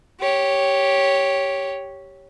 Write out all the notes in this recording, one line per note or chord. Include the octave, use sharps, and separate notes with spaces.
G4 C#5